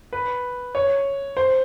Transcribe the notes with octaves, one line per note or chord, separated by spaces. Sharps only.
B4
C#5
C5